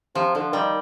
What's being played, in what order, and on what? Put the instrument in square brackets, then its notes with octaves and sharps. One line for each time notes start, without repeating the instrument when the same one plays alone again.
[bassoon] C3 [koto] F3
[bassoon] D3 [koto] F3
[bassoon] D#3 [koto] G3